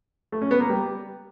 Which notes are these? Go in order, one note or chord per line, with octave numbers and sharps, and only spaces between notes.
A3
C#4
B3
A#3
G3